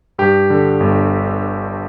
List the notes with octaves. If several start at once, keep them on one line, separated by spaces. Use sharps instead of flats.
G2 G4
D3
G1